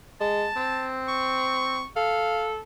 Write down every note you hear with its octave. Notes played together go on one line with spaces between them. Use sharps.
G#3 A5
C4
C#6
A4 F5